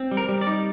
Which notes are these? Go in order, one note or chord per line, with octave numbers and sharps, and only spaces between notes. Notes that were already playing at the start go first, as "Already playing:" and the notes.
Already playing: C4
G3
A#4
G3
D5
D#4